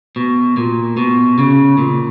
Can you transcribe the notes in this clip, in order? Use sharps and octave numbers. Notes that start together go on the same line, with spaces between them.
B2
A#2
B2
C#3
A#2